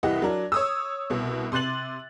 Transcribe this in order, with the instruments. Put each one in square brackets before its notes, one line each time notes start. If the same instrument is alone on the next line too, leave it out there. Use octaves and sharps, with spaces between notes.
[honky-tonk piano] C2 E3 E4 G4 D#5 F#5
F#3 D4 A#4
C#5 D#6 E6
C2 B2
C3 C6 F#6 A6 F#7